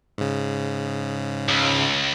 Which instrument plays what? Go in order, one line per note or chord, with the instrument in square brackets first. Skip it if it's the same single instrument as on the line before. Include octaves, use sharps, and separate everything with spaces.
[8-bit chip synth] G#2 C#3
[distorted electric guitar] C#2